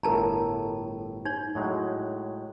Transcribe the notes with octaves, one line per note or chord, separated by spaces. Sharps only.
G1 A2 A#4 A5 A#5
D#4 C#5
A2 F#3 G#3